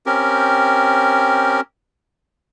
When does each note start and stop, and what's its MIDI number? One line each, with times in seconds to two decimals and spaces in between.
0.06 1.61 60
0.06 1.61 61
0.06 1.61 67
0.06 1.61 70